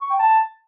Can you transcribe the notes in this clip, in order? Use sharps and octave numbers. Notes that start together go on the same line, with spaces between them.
C#6
G5
A5